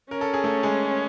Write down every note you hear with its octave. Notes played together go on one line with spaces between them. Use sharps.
C#4 A#4
A4
G#4
A3 A4
G#3 G#4